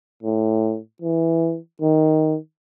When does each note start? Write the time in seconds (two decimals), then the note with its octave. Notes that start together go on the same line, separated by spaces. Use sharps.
0.23 A2
1.02 E3
1.82 D#3